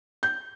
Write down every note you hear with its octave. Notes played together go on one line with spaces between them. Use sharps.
G6